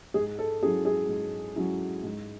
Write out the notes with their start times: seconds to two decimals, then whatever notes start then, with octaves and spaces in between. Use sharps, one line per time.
0.14 G#2 G#4
0.39 A4
0.62 F#3 C#4 E4 G#4
0.85 G#4
1.09 G#2
1.56 F#3 C#4 E4
2.03 G#2